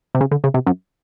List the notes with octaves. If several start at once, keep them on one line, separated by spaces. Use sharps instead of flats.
C3
C#3
D3
C#3
C3
F#2